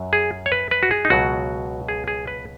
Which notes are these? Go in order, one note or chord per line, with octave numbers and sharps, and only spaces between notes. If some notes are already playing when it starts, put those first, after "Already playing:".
Already playing: F#2 F#3
G#4
C#5
B4
B4
F#4
G#4
D#4
C#2 B2 F#3 F#4
G#4
G#4
B4